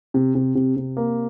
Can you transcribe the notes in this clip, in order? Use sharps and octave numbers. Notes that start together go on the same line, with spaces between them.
C3
C3
C3
C3
A#3